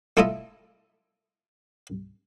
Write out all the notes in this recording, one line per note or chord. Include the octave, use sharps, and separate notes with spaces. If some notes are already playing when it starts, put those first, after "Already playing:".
A3 E4 F4 A4 D#5 E5